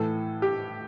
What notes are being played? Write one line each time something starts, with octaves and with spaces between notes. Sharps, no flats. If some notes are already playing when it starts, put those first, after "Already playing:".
Already playing: A2 E3 A4
G4